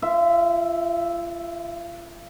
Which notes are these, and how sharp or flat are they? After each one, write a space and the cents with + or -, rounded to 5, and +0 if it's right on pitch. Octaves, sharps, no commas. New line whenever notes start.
F4 -35 E5 +0